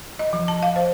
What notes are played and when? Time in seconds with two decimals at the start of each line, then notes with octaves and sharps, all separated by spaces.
0.19 D#5
0.33 F3
0.48 A5
0.63 F5
0.76 C5